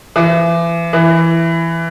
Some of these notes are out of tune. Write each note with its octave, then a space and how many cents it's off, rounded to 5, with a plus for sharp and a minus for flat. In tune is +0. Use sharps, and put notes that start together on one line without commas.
E3 +35
E3 +10